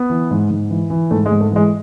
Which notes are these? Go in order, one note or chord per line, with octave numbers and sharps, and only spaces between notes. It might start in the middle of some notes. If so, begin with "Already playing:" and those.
Already playing: B3
E3
G#2
G#2
E3
E3
G#2 A3
G#3
G#2
A3
E3 G#3